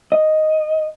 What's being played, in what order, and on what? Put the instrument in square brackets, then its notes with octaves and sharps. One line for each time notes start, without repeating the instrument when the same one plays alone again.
[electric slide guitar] D#5